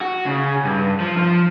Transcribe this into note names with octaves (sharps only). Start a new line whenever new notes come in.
F#4
C#3
G2
F3
F3